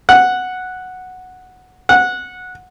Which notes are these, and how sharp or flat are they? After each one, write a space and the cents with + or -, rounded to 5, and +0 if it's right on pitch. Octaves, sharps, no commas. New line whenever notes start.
F#5 -5
F#5 -15